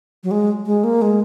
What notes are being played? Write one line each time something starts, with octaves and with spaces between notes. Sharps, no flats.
F#3
G#3
G#3
A#3
G#3